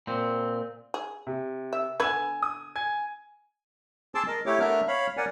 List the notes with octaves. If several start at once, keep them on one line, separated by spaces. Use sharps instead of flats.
A#2 C4
G#4
C3
E5
D3 B3 B4 G#5 E6 G#6
D#6
G#5 G#6
G#4 A5 C6 D6 E6
A#4 D#5
A3 E4 G4 C#5 D6
A3 B3 D4 A#4 E5 F6
C#5 F5 B5
A#4 D5 F#5 G#5